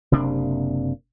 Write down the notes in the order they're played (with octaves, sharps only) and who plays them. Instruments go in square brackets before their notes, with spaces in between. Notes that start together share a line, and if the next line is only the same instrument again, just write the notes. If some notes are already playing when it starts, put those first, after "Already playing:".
[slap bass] F#1 C3 A#3 D4